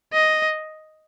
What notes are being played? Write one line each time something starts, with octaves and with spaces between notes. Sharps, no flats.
D#5